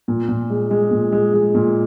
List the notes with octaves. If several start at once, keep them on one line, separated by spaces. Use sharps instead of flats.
A#2
A#2
G#3
G#3
A#2
G#3
G#3
A#2